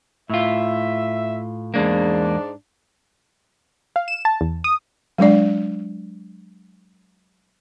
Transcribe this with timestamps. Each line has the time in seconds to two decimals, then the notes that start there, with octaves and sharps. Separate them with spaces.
0.30 A2 F4 E5
1.74 E2 G#2 G#3 A#3 D4
3.96 F5
4.08 E7
4.25 A5
4.41 E2
4.64 D#6
5.18 F#3 G#3 D4 D5